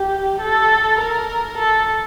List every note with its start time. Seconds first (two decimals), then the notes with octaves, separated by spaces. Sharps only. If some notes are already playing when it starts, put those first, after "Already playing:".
Already playing: G4
0.41 A4
0.99 A#4
1.58 A4